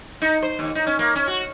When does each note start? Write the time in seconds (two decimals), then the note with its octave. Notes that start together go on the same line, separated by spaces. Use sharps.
0.22 D#4
0.43 C5
0.59 D#2
0.75 D#4
0.87 C#4
0.99 A#3
1.15 C#4
1.28 F#4